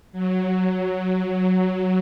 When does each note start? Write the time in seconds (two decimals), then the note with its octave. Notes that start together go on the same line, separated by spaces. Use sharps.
0.12 F#3